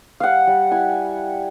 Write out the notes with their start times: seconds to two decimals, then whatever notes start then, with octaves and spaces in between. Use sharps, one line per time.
0.20 G3 F5 F#5
0.47 G3
0.71 E4 G#5